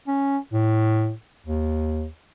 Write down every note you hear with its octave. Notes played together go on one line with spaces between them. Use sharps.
C#4
A2
D#2